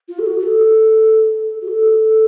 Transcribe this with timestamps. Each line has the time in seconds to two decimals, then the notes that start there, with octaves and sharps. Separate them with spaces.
0.09 F4
0.19 A4
0.26 F#4
0.39 F#4
0.44 A4
1.62 F#4
1.68 A4